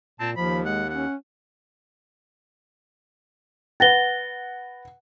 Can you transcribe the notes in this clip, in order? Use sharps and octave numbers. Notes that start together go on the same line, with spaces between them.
A#2 C4 A5
D#2 F3 B5
G#3 F#5
C#4 F#5
B4 F#5 A6 A#6 G7